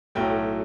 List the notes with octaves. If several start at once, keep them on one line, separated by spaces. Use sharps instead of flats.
B1 A2 F#3 A3 G5